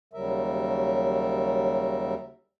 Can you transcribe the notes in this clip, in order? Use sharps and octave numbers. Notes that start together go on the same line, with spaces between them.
D#2 C#3 F#3 G3 A#4 E5